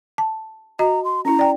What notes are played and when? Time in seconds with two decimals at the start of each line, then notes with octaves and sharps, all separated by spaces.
0.18 A5
0.79 F#4 D#5 A#5
1.05 C6
1.25 C#4 E4 A#5
1.39 D5 G5